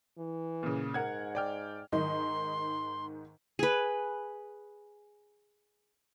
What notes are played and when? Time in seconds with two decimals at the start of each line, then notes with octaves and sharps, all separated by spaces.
0.18 E3
0.63 A#2 C#3
0.94 G#2 A#4 F#5 G#6
1.35 D5 G5 F6
1.93 G#2 D#3 D#4 C6
3.59 G#4 B4